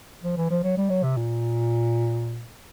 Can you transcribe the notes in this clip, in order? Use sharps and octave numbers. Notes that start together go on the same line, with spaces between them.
F3
E3
F3
F#3
G3
F#3
C3
A#2